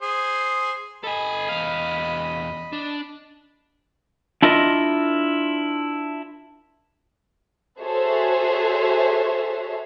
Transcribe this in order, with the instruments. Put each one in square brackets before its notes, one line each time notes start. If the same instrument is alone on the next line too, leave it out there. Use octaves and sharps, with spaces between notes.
[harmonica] G#4 C5
[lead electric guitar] A4 G#5 [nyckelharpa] D#5 B5
[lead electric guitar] E2 F5
D4
[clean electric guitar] D4 E4 F4 A#4 D#5
[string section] F#4 G#4 A4 C5 C#5 E5